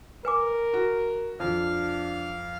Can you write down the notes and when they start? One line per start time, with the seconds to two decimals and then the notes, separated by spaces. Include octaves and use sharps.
0.25 A#4 B4 G#5 D6
0.74 F#4
1.40 F2 D4 F5 F6